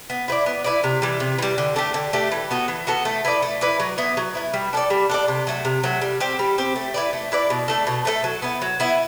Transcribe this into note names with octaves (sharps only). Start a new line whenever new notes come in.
B3
E4 B4 D5
B3
E4 B4 D5
C3
E3 G3
C3
E3 G3
D3
A3 D4 G4
D3
A3 D4 G4
E3
B3 F#4 A4
E3
B3 F#4 A4
A3
E4 B4 D5
A3
E4 B4 D5
F#3
B3 E4
F#3
B3 E4
G3
D4 A4 D5
G3
D4 A4 D5
C3
F#3 A3
C3
F#3 A3
G3
C4 G4
G3
C4 G4
A3
E4 B4 D5
A3
E4 B4 D5
B2
A3 D4 A4
B2
A3 D4 A4
F#3
B3 E4
F#3
B3 E4